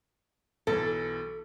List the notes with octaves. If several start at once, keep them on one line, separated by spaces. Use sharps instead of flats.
B1 E3 A4